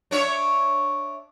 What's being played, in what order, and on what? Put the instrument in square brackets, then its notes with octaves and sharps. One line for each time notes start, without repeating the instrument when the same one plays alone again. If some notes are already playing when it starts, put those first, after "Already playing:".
[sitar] D4 C#5 E5